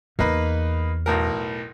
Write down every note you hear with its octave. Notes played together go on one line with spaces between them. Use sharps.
E2 A#3 D#4 B4
B1 A2 A#4